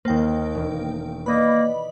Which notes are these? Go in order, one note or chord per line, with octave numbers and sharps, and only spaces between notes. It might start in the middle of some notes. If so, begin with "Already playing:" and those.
D#2 A#3 C5 G5
E1
A#3 B4 D5 D#5 B5